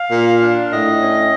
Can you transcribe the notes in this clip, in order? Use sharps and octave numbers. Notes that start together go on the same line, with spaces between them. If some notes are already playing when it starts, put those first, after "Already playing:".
Already playing: F5
A#2
D4
A2 D#5
C#4